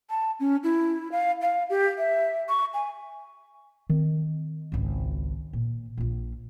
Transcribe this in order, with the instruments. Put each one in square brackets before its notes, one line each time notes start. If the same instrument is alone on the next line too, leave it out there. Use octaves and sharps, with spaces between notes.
[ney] A5
C#4
E4
F5
F5
G4
E5
C#6
G#5
[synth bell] D#3 [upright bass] C4
[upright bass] G#1 C#2
A#2
A#1 F4